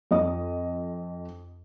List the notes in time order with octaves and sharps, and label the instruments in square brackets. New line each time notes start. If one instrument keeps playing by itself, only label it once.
[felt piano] F2 D#5 D#6